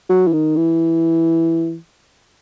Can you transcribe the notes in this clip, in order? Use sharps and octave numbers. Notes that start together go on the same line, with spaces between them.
F#3
E3
D#3
E3